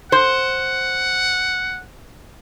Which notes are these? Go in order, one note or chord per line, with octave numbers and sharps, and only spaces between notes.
C5 F#5